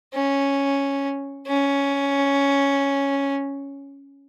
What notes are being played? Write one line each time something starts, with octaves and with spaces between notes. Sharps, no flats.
C#4
C#4